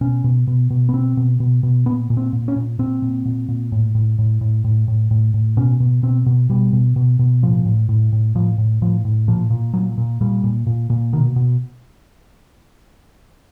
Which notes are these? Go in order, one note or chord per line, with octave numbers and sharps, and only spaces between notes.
B2 C#4
B2
B2
B2
B3
B2 C4
B2
B2
B2
A#2 B3
A#2
C4
A#2
C#4
A#2
A#2 C4
A#2
A#2
A#2
A2
A2
A2
A2
A2
A2
A2
A2
B2 C#4
B2
B2 C4
B2
B2 G3
B2
B2
B2
A2 F3
A2
A2
A2
A2 F3
A2
A2 F3
A2
A#2 F3
A#2
A#2 F#3
A#2
A#2 G3
A#2
A#2
A#2
B2 D#3
B2